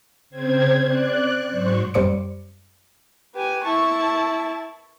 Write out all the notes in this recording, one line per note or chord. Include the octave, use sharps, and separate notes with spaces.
C#3 C4 C5 G#6
D5 F#6
G#2 F#3 C5 C#6
F#2 G3 C5 D6 C#7
G4 B4 G#5
E4 A5 C#6